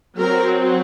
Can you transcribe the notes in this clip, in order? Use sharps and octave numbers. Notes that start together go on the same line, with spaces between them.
F#3 C4 A#4